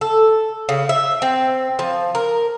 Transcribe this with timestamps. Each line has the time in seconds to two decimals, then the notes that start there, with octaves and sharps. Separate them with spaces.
0.01 A4
0.69 C#3
0.89 E5
1.22 C4
1.79 F3
2.15 A#4